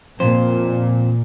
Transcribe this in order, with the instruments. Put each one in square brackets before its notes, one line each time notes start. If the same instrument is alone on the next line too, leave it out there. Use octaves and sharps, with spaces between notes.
[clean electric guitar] F2 C5 [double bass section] A#2